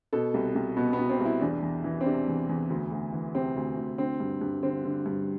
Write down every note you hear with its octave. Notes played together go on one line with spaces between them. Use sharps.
B2 A4
C2
C2
B2 B3
B3
B2
C4
C2
E4
E2 D4
E2
E3
C4
C3 D4
E2
E2
D2
D2
E3
C3 C4
D2
D2
D3 C4
G2
G2
D3 C4
D3
G2